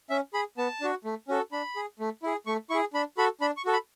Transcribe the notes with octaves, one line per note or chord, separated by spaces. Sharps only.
C#4 E5
G#4 B5
B3 A5
D4 F#4
A3
C#4 F#4 A4
D4 B5
G#4
A3
E4 G#4
A3 C#6
E4 G#4 C#6
D4 B5
F#4 A4 B5
D4 B5
C#6
F#4 A4
B5